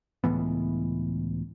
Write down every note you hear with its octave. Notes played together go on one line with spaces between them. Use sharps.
C#2 A2 E3 B3